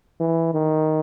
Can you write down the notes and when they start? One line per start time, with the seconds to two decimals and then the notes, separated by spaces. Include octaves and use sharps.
0.20 E3
0.54 D#3